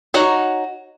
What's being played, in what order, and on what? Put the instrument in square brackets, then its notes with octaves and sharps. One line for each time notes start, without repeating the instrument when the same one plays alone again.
[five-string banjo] D#4 F#4 C#5 A#5